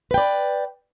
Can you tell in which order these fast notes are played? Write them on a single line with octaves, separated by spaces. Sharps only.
B4 G5 D5